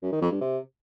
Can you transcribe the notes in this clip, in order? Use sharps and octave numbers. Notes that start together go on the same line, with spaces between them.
F#2
D#3
F2
G2
C3